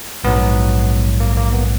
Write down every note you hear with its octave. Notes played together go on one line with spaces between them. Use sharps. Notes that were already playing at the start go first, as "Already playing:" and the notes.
A#1 G#2 F#3 B3
A#3
A#3
B3